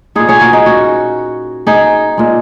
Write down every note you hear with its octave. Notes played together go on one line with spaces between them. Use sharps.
A#2 G#3 D#4 G#4
G#4 C#5
F#4 A#4
D#4 G#4
C#4 F#4
D#4 G#4
A#2 G#3